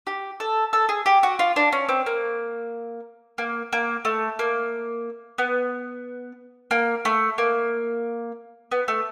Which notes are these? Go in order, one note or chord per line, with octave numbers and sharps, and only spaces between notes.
G4
A4
A4
G#4
G4
F#4
F4
D4
C#4
C4
A#3
A#3
A#3
A3
A#3
B3
A#3
A3
A#3
B3
A3